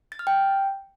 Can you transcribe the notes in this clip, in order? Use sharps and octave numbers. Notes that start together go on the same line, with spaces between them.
A6
F6
G5